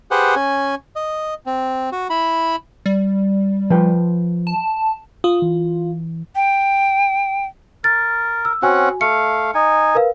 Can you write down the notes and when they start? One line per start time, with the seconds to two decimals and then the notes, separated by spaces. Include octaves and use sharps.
0.11 G4 G#4 B4 C5 F#5
0.36 C#4 G#5
0.96 D#5
1.46 C4
1.92 F#4
2.10 E4 B5
2.86 G3
3.70 F3 B4 G5
4.47 A5
5.24 F4 D#6
5.42 E3
6.35 G5
7.84 A#4 A6
8.45 E6
8.62 C4 C#4 F#4 F#5 G#5
9.01 A3 F5 C#7
9.54 D#4 G#5
9.95 A#4 B4 F5